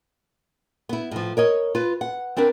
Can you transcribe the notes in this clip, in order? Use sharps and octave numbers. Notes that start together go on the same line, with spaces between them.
B3 E4
A2 F3
A#4 C#5 D#5
F4 B4
F#5
C4 D4 A#4 B4